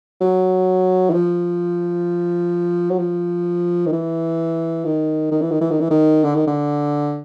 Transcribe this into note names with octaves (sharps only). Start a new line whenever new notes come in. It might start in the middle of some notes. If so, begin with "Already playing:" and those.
F#3
E3
F3
F#3
F3
D#3
E3
D#3
D#3
E3
D#3
E3
D#3
E3
D#3
D3
D#3
D3